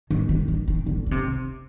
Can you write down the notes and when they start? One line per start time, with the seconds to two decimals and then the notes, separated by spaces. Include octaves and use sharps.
0.10 D#3
0.29 D3
0.48 D#3
0.68 D#3
0.86 D3
1.06 D3
1.11 C3